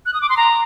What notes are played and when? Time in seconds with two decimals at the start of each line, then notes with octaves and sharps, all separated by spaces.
0.06 F#6
0.14 D#6
0.22 D6
0.29 C6
0.37 A#5